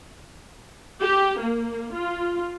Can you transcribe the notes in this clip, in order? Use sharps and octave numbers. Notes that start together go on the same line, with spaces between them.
G4
A#3
F4